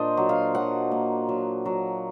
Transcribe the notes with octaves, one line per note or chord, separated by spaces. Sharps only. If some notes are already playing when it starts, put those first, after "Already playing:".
Already playing: A#2 A#3 D4 C5 D#5
F#3
F5
F#3 F#5
A#3
F#3
F#3